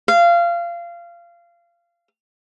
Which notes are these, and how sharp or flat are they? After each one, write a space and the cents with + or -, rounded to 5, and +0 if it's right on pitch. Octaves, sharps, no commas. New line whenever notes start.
F5 -25